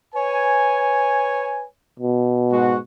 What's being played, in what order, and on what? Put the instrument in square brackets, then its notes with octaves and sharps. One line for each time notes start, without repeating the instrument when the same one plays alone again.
[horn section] B4 C#5 G#5
[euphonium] B2
[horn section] G#2 G#3 F#4